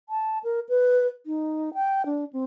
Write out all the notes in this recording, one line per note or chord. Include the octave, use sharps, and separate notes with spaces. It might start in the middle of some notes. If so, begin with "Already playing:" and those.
A5
A#4
B4
D#4
G5
D4
C4